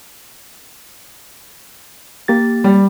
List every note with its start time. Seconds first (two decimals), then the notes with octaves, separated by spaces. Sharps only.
2.28 A#3 G4 A6
2.64 G3